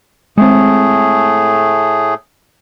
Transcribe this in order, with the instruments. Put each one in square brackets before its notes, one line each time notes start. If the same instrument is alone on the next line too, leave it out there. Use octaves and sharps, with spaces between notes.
[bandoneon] A2 A3 G#4 [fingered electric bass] G#3 C4